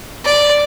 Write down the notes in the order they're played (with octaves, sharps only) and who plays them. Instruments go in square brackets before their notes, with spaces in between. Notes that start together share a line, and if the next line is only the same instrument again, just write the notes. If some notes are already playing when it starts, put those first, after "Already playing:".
[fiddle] D5